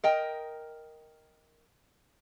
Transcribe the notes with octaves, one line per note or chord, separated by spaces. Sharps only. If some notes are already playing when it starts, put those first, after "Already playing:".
A#4 D#5 G5